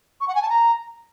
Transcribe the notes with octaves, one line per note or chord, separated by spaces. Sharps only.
C#6
F#5
G#5
A5
A#5